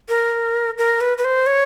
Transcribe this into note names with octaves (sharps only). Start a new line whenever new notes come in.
A#4
A#4
B4
B4
C5
C#5